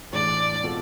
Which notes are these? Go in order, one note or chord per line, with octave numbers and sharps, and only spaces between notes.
A2 E3 G#3 D4 D5
B2 G#3 C4 F4 A4